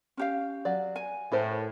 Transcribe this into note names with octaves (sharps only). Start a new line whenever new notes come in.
C#4 G4 F5
F#3 D5
G#5
A2 E4 A#4 C5